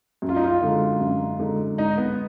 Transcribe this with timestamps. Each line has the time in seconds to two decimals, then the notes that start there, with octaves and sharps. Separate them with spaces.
0.22 F#2
0.29 F4
0.36 D#4
0.44 F4
0.61 D3 G#3 D#4
1.00 F#2
1.39 D3 G#3 D#4
1.78 G#2 D#4
1.98 B3